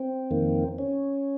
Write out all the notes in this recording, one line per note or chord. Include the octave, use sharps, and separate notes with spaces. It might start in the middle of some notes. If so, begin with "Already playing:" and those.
Already playing: C4
F2 D#3 A#3
C#4